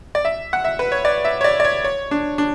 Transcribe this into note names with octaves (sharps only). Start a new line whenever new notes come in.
D5
E5
F#5
E5
B4
C#5
D5
E5
C#5
D5
D5
C#5
C#5
D4
D4